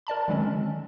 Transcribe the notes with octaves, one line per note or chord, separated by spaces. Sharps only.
A#4 D5 A5 B5
D3 D#3 F#3 G#3 C4 C#4